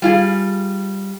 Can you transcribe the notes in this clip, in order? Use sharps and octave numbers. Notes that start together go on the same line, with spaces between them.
G3 F4 G#4